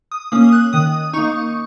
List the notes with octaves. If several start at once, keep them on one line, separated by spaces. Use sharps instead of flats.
D#6
A#3 C#4 D#6
F#6
D#3 D#6
A#3 D#4 C#6